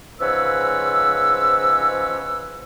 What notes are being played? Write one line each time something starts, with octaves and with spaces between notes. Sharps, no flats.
G#2 C#3 F3 B4 C#5 E6